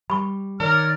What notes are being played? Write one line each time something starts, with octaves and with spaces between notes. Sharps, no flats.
G3 B5 C#6
D#3 A#4 C#5 D5 F6